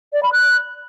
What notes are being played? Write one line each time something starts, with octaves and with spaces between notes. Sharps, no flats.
D5
B5
F#6